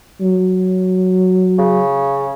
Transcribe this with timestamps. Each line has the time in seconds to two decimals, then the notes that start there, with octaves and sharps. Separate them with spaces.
0.21 F#3
1.58 C#3